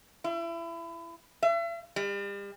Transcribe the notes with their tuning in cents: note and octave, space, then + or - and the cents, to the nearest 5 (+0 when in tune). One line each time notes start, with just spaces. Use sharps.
E4 +30
E5 +40
G3 +40